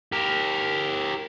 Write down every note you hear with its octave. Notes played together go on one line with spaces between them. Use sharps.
G4 A#4